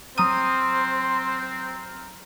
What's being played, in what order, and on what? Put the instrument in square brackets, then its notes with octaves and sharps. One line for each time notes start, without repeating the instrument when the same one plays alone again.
[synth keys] F#3 A#5 F6 [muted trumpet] C4 [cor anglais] C5 [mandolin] D#6